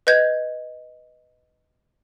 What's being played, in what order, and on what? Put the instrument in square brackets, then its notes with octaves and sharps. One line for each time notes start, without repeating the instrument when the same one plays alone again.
[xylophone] B4 D#5 G6 G#6